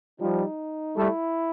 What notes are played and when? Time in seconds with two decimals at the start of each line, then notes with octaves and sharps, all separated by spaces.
0.20 F3 G3 D#4
0.96 G3 A3 E4